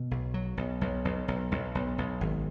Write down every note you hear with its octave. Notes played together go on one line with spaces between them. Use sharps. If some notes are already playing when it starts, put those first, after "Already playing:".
Already playing: B2
B1
F#3
B1
B1
B1
B1
B1
B1
B1
G#1